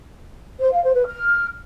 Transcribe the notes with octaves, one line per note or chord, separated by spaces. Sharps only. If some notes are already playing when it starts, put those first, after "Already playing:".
C5
F5
C5
B4
F6